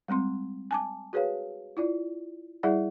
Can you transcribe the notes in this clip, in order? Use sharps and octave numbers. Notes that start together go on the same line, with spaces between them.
G3 G#3 C4 C6
G#5 A5 D6
F#4 G#4 B4 C#5 F5
E4 F4 D5
G3 E4 G#4 D5 E5 F#5